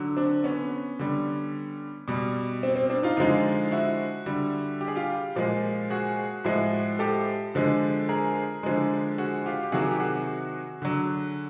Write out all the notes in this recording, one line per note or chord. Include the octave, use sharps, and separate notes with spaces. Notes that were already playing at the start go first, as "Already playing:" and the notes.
Already playing: D3 F#3
C4 D4
B3 C#4
D3 G3
B2 G3
C4
C4
C4 D4
D#4 F4
D3 F3 G#3 D#4 F4
E4 F#4
D3 G3
G4
G#4
F4 G4
A#2 F3 G#3
F#4 G#4
A2 F3 G#3
G4 A4
D3 F3 G#3
G#4 A#4
D3 F3 G#3
F#4 G#4
F4 G4
G4
C3 D#3 F#3 F#4 G#4
G4
F#4 G#4
D3 F#3